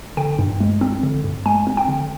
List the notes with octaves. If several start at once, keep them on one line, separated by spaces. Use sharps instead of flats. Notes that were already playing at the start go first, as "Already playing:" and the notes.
D3 G5
G2
G#3
C4
D3
G2
G#3 G#5
C4
G5
D3